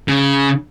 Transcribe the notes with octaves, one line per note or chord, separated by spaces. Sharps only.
C#3